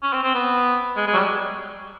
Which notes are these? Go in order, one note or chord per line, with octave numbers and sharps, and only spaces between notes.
C#4
C4
C4
B3
G#3
G#3
F#3
G3